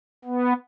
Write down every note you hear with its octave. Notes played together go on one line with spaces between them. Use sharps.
B3